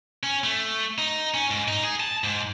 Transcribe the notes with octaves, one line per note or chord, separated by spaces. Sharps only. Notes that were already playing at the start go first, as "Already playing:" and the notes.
C#4
A3
D#4
C#4
G#2
D#4
G#4
A5
G#2